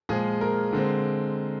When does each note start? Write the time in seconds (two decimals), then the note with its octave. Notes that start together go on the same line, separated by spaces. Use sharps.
0.09 A#2 F3 G#3 G#4
0.41 A#4
0.73 D3 G#3 C4